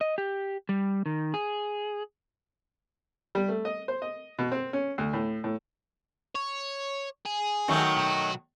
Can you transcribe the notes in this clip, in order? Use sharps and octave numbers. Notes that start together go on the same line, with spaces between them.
D#5
G4
G3
D#3
G#4
G3
A3
D#5
C5
D#5
B2
C4
C#4
D2
A2
A2
C#5
G#4
D#3 F#3 A3
B1 F#4